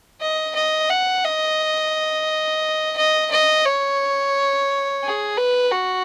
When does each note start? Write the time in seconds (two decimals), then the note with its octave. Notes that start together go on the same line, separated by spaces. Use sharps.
0.21 D#5
0.55 D#5
0.90 F#5
1.25 D#5
2.97 D#5
3.31 D#5
3.65 C#5
5.04 G#4
5.37 B4
5.72 F#4